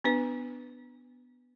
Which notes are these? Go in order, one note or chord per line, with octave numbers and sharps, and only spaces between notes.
B3 D4 B4